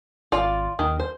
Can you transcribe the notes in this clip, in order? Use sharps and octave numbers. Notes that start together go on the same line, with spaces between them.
G#1 F4 D5
D#2 D#3
C5